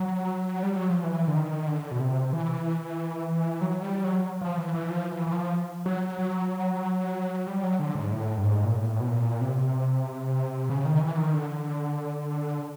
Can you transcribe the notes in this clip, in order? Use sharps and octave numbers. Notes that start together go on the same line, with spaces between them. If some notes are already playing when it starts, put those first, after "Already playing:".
Already playing: F#3
G3
F#3
F3
E3
D3
D#3
D3
B2
C3
E3
F#3
G3
F#3
F3
E3
E3
F3
E3
E3
F3
F#3
F#3
G3
F#3
D3
G#2
A2
G2
G#2
A#2
A2
B2
A#2
C3
C#3
D#3
E3
D#3
D3